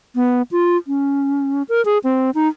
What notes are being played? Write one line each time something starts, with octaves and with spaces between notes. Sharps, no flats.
B3
F4
C#4
A#4
G#4
C4
D#4